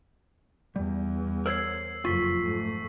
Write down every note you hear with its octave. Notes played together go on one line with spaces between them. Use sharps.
E2 G3
A#4 C5 C#5 E6 C7
F#1 F2 F4 C#6 B6
G#2 A3